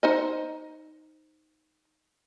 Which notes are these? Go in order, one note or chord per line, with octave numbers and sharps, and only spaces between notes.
D#4 C5 D#5